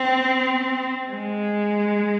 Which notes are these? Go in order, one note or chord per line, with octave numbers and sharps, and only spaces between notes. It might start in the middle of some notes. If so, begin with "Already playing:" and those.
Already playing: C4
G#3